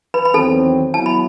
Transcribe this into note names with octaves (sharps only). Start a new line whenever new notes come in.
B4 B5
B5
E2 D#3 F#3 C4 A4 A5
F#3 B3 E4 A5
B5